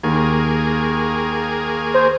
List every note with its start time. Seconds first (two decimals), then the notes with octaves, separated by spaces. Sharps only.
0.03 D#2 A#3 G#4
1.94 C5